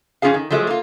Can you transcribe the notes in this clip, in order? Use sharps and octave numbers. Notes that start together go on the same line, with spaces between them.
F2 D#3 C#4 F4 G#4 F5
D#3
F3 F#3 G#3 A3
A#3 F4